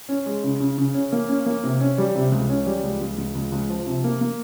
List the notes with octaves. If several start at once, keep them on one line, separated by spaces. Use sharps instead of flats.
C#4
G#3
C#3
C#3
C#3
C#4
A#3
C#4
A#3
C3
C#4
G3
C3
C#2
C#4
G3
C#2
C#2
C#2
C#2
C#2
F3
C3
A#3
A#3